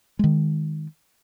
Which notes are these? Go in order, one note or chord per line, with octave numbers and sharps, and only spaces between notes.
D#3 G#3